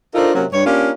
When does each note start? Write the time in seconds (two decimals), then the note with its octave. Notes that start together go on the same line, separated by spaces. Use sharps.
0.15 D4 D#4 F4 A4 A#4 C5
0.35 C3 F#3 A#3 C#4
0.52 G2 C#5
0.65 A#3 C#4 D4 F4 G4 A#4